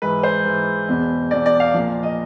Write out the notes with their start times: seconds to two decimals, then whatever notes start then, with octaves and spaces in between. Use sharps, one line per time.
0.02 G#2 E3 B4
0.23 C5
0.44 G#2 E3
0.88 E2 B2
1.31 E2 B2 D5
1.46 D5
1.60 F5
1.74 A#2 F3
2.03 D#5